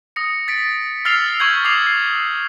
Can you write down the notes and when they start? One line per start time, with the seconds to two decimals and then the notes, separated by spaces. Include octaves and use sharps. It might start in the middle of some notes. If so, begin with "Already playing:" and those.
0.16 D#6 A#6 C#7
0.48 A6 B6 D7
1.05 E6 F6 A6 C7 F7 G7
1.40 C#6 F6 G6 G#6 F#7
1.65 D6 D#6 C7 F7
1.87 C7